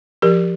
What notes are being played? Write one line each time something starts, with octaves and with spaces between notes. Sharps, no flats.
F3 G4 A#4